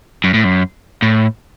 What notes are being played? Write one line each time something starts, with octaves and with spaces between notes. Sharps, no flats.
F#2
A2
F#2
A2